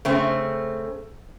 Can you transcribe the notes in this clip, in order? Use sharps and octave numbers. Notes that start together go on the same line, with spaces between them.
C#3 A3 C4